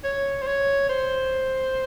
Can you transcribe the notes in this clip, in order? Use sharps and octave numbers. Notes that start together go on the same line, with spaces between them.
C#5
C5
C#5
C5